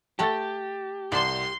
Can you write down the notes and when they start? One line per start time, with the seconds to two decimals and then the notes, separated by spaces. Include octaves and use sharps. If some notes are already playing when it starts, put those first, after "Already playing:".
0.19 A3 G4 F#5 A5 A#5 A6
1.12 C2 D5 A5 C6